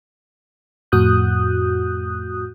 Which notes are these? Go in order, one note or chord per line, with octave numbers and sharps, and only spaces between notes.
F2 A2 F#4 D#6 F#6 G6